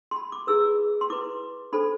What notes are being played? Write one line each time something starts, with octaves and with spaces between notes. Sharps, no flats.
C6
B5
D6
E4 G#4 B4 E6
C6
E4 B4 D6
D4 A4 C5 B5